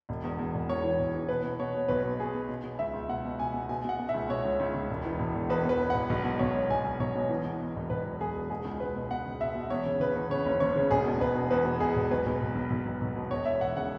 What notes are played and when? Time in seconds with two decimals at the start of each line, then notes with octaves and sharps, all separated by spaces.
0.09 E1
0.24 E2
0.39 E2
0.54 E1
0.69 E2 C#5
0.84 E3
0.99 E1
1.14 E3
1.29 B2 B4
1.43 B2
1.59 B2 C#5
1.75 B2
1.88 B1 B4
2.04 B2
2.19 B2 G#4
2.34 B2
2.49 B2
2.64 B2
2.79 C#2 E5
2.94 C#2
3.09 B2 F#5
3.25 B2
3.39 B2 G#5
3.54 B2
3.69 B2 G#5
3.85 B2 F#5
3.99 B2
4.09 E5
4.14 C#2
4.29 B2 C#5
4.45 C#2
4.60 C#2
4.74 C#2
4.90 E1
5.05 E3
5.19 E1
5.35 E1
5.49 E2 B4
5.65 E2 B4
5.79 E2
5.90 E1 F#5
6.10 B1
6.24 B2
6.39 B1 C#5
6.55 B1
6.70 B1 G#5
6.85 B1
7.00 B1 C#5
7.16 B2
7.29 E3
7.45 E2
7.60 E2
7.76 E1
7.90 E1 B4
8.05 E3
8.20 E1 G#4
8.36 E1
8.50 B2 G#4
8.65 C#2
8.80 C#2 B4
8.96 B2
9.10 B2 F#5
9.26 C#2
9.41 B2 E5
9.55 B2
9.70 E2 C#5
9.86 C#3
10.00 C#3 B4
10.15 E2
10.30 C#3 C#5
10.46 F#1
10.60 F#1 C#5
10.76 C#3
10.91 E1 G#4
11.06 B2
11.21 E1 B4
11.35 B2
11.51 E2 B4
11.65 B2
11.80 E1 G#4
11.96 E1
12.11 B1 B4
12.26 B1
12.41 B1
12.55 B1
12.70 B1
12.86 B1
13.01 B1
13.16 B2
13.30 E1 C#5
13.45 E2 E5
13.61 E1 F#5
13.77 C#3 F#5